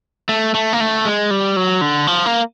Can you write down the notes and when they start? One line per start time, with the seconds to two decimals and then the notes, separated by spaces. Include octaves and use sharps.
0.29 A3
0.54 A3
0.73 A#3
0.80 A3
1.05 G#3
1.31 G3
1.56 F#3
1.81 D3
2.07 F3
2.26 A#3